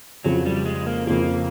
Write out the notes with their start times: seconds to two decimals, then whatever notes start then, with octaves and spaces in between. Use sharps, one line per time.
0.24 F2 C#3 F3 F#3
0.46 G3
0.66 G#3
0.87 A#3
1.07 F2 C#3 F3 A#3